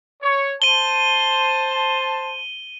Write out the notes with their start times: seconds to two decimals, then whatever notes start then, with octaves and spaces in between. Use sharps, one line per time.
0.23 C#5
0.62 C5 A5 D#7 G7